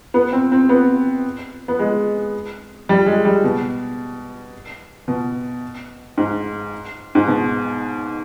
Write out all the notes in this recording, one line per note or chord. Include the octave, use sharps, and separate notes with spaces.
B3
C4
C4
B3
B3
G#3
G3
G#3
G3
B2
B2
G#2
G#2
B2